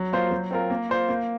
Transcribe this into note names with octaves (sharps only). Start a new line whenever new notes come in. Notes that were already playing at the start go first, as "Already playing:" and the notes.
Already playing: F#3
A#3 F4 C5
F#3
C4 F4 A#4
A#3
F4 C5
A#3